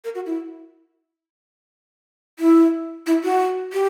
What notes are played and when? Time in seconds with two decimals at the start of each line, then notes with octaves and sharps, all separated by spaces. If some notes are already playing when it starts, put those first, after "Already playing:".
0.04 A#4
0.15 F#4
0.26 E4
2.39 E4
3.07 E4
3.24 F#4
3.73 G4